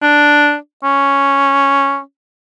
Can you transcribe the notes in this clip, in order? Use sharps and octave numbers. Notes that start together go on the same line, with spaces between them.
D4
C#4